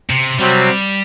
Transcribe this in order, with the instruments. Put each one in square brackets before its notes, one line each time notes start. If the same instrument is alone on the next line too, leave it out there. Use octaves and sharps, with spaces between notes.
[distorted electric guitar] C3
[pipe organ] C3 F#3 C4 [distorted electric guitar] G3